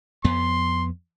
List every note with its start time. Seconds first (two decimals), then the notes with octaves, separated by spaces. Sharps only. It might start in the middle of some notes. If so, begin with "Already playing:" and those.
0.25 F2 B3 C6